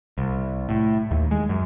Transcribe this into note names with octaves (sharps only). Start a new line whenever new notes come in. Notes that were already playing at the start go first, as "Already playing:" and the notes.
C2
A2
D#2
G#3
F#2